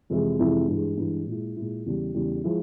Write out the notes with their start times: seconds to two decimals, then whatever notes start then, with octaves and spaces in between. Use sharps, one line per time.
0.10 F2 C3 E3 G#3 E4
0.39 F2 C3 E3 G#3 E4
0.68 G2 E3 G#3
0.97 G2 E3 G#3
1.27 A#2 G#3 E4
1.56 A#2 G#3 E4
1.86 E2 C#3 G3
2.14 E2 C#3 G3
2.44 F3 G#3 E4